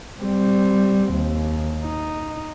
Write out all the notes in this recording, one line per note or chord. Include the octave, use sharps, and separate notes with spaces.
G3 C4
D#2
D#4